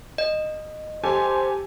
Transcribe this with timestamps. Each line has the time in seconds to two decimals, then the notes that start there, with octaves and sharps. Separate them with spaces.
0.18 D#5
1.04 G4 A4 C5 G#5